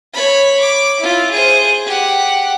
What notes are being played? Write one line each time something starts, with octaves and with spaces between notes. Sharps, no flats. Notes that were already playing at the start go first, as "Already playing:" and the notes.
C#5 B5
D6
E4 F4
G#4 C5
G4 F#5